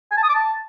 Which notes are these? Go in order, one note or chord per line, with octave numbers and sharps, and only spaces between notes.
G#5
A5
D#6
D6
A5